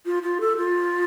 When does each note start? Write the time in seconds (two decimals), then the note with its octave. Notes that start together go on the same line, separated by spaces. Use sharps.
0.06 F4
0.23 F4
0.41 A4
0.57 F4